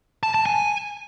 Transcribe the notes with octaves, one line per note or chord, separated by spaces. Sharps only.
A5
A5
G#5